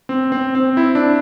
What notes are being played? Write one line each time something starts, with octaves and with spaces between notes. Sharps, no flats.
C4
C4
C4
E4
D4